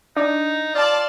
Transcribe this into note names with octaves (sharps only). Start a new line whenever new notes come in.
D4 D#4
F4 D5 A5